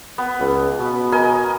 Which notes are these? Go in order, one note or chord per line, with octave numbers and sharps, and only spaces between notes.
B3
C#2
B2
A#4 D#5 G#5